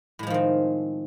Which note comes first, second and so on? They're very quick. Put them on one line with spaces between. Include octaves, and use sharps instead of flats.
A2 G#3 F3 D#3 C4